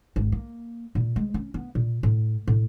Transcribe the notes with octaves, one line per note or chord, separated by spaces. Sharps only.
G#1
A#3
A#2
G#3
C#4
B3
A#2
A2
A2